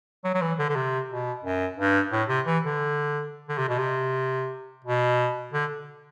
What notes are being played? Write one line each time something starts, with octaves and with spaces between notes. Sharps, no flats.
F#3
F#3
E3
D3
D3
C3
B2
F#2
G2
A2
C3
E3
D3
D3
C3
B2
C3
B2
D3